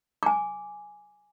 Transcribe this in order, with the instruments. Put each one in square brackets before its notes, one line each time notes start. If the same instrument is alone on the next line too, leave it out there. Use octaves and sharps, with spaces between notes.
[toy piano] G#5 D6